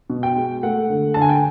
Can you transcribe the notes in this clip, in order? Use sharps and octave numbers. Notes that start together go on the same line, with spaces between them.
B2
G5
G#3
A3 F#5
D3
D3 A5
G#5
G5